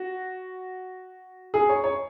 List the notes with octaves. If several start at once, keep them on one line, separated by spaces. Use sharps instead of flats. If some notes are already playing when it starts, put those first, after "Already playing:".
Already playing: F#4
G#4
C#5
C#5